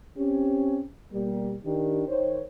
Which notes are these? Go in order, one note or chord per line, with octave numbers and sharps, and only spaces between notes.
C4 C#4 G4
B2 G3 A#3
D#3 D4 G4
D#3 C5 C#5